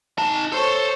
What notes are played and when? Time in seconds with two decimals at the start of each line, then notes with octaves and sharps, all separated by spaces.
0.18 D#4 A5
0.52 A4 C5 C#5